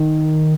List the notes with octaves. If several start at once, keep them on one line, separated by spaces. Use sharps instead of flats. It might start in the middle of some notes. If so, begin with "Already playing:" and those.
Already playing: D#3